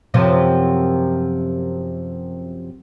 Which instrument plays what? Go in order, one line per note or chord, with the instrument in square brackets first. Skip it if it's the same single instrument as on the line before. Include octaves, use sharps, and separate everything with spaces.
[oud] F#2 C3 F3